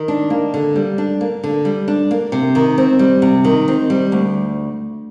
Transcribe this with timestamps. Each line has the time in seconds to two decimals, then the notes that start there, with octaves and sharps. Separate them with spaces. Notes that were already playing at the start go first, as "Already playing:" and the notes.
Already playing: D#3
0.08 D4
0.30 A#3
0.54 D3
0.76 G3
0.98 D4
1.21 A#3
1.44 D3
1.65 G3
1.88 D4
2.11 A#3
2.32 C3
2.55 D#3
2.78 C4
2.99 G3
3.22 C3
3.44 D#3
3.68 C4
3.90 G3
4.12 D2